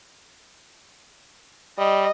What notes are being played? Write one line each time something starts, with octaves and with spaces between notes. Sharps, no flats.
G3 D#5